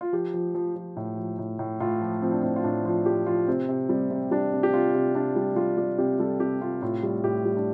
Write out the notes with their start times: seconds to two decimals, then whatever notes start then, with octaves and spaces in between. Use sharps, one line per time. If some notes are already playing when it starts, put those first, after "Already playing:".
0.01 F4
0.13 F3 G4
0.34 F3
0.55 F3
0.76 F3
0.96 A2
1.18 F3
1.39 A2
1.59 A2
1.80 A2 F4
2.01 F3
2.22 F3 C4
2.32 D4
2.42 A2 C4
2.56 F4
2.64 A2 D4
2.85 F3 F4
3.06 F3 G4
3.26 F3 F4
3.48 C3 C4
3.69 C3
3.89 G3 C4
4.10 C3
4.31 G3 D4
4.53 C3
4.63 G4
4.73 C3 F4
4.94 C3
5.15 C3 D4
5.36 G3
5.56 G3 F4
5.78 G3
5.98 C3 G4
6.19 G3 A4
6.40 C3 G4
6.61 C3 F4
6.82 A2 F4
7.03 G3
7.24 A2 G4
7.45 G3
7.57 D4